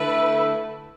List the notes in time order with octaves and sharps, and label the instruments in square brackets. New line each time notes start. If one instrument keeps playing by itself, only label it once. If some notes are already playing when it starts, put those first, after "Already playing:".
Already playing: [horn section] D3 A3 E4 A4 E5 [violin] B4